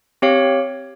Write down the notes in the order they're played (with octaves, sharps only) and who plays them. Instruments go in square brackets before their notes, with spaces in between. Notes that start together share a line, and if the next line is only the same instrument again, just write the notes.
[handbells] C4 G4 C#5 F5